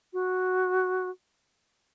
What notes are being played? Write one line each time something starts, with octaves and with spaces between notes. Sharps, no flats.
F#4